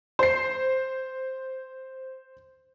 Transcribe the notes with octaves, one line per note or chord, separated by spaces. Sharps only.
C5 C7